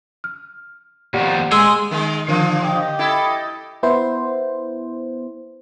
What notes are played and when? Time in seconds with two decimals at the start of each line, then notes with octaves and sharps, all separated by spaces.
0.24 F6
1.14 D#2 F3 G4 D5 F#5
1.52 G#3 G#4 G#5 C6 E6
1.91 D#3 G#3
2.27 A#2 D3 F3
2.62 G4 D#5
2.99 E4 A4
3.83 B3 E4 C5